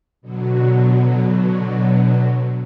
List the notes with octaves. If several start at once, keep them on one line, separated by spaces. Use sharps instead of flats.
B2 D3 F#3